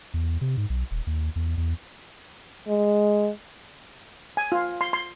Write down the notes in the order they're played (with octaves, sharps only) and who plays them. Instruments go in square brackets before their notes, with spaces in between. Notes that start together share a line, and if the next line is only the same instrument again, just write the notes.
[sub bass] E2
C3
G#2
B1
D#1
D#2
E2
E2
[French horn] G#3
[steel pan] G#5
F4
C6
C6